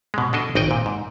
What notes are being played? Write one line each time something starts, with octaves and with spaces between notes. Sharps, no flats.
B2 G#3
B2 D4 A4 D#5
G#1 D#4 D#5 G5
A#2
G#2